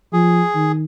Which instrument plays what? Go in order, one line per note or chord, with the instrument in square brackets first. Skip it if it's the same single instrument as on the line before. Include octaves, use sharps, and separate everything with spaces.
[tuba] F3 [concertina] G#4
[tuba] D#3